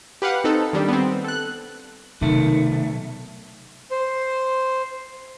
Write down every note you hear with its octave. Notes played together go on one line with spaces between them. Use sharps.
G4 B4 F5 F#5
C4 D#4 A4
D#3 G3 D4
B3 C4
A4 F#6
B1 C3 D#3 A3
C5